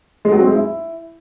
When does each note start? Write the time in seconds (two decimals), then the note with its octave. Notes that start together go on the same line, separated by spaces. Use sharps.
0.25 G#3
0.32 F#3
0.40 C4
0.47 G#3
0.54 E4